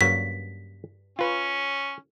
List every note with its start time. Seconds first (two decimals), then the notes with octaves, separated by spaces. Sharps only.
0.01 G2 C#3 F#3 A#3 B6
1.19 C#4 F4 B4